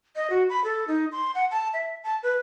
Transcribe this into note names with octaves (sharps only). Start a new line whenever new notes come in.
D#5
F#4
B5
A4
D#4
C6
F#5
A5
E5
A5
B4